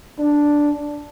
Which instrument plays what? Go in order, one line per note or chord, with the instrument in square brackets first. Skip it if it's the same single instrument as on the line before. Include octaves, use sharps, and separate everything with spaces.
[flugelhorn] D4